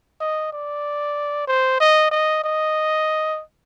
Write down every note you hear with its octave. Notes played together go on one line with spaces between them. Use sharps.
D#5
D5
C5
D#5
D#5
D#5